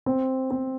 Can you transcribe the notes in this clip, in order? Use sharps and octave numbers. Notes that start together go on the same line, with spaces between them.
C4
C4